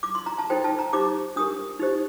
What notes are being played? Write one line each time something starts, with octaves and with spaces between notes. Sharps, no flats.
D6
C6
A#5
A5
D#4 A4 C5 G5
A5
A#5
D#4 G4 C5 D6
D4 G4 A#4 D#6
D#4 G4 C5